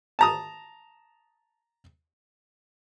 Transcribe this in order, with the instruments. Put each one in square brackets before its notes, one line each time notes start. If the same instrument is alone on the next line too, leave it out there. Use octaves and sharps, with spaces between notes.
[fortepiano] A5 A#5 D#6